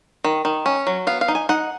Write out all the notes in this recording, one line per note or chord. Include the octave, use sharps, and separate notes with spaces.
D#3
D#3
C#4
F#3
B3 F5
F5
D#4
G#5
D#4 F#5